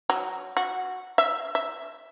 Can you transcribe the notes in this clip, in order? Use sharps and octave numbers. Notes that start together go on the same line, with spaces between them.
F#3
F#4
E5
E5